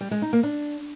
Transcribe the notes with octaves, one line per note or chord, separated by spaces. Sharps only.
G3
G#3
D#4
A#3
D4